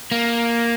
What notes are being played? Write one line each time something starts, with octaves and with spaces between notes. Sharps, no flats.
A#3